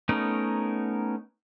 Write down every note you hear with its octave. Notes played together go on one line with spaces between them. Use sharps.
A3 B3 C#4 D#4 A#4